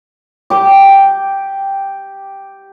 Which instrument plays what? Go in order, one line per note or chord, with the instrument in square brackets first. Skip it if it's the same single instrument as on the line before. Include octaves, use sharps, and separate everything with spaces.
[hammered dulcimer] G4 D6